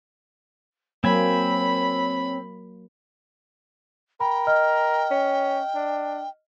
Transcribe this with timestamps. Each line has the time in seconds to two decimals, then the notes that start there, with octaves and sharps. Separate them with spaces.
1.04 F#3 A#3 C4 C#5 G#5 B5
4.20 A#4 G5 B5
4.47 D#5 F6
5.11 C#4
5.75 D4